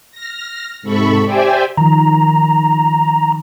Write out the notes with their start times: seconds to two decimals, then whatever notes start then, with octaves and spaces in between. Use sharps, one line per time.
0.11 F6 A#6
0.82 G#2 C3 A4 B5 C#6
1.24 G4 C5 D5 E5 G5 G#5
1.77 D#3 F3 A#5